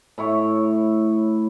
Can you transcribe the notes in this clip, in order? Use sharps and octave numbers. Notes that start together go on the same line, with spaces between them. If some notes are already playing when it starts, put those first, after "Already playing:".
A2 E4 C#5